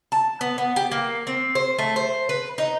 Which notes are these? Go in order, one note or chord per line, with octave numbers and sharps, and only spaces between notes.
A5
B3
B3
G4
A#3
C4
C5
A3
C5
B4
D#4